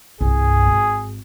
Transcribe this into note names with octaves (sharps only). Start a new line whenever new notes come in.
C2 G2 G#4
G#1